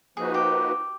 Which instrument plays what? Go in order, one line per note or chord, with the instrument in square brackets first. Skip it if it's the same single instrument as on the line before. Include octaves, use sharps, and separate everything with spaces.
[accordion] F3 A#3 D#4 F#4 B4 [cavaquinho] G#4
[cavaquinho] G4